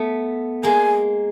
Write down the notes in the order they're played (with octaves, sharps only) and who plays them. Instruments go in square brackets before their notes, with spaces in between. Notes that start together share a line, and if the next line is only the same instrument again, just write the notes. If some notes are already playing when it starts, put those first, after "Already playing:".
Already playing: [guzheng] A3 B3
[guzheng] G#3 A#3 [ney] G#5